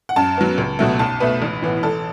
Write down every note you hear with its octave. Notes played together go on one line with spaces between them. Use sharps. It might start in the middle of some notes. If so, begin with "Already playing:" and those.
F#5
F#2 A5
F#3 B3
C#2
B2 F#3 A3
B1 A5
B2 A3 B4
A1
A2 E3 B3
A1 A4